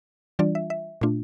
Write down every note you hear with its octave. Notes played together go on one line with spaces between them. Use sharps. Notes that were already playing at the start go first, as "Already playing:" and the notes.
E3 G3 D4 F4 D5
E5
E5
A#2 A3 D4 F4